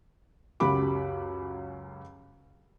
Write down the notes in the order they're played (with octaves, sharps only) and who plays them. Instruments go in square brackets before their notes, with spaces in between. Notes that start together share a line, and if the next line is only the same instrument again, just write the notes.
[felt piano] C#2 F#2 F#4 G4 B5 D6